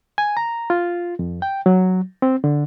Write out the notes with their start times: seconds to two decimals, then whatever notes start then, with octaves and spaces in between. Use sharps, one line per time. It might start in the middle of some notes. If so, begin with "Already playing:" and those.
0.18 G#5
0.37 A#5
0.70 F4
1.19 F2
1.42 G5
1.66 F#3
2.22 C4
2.44 D3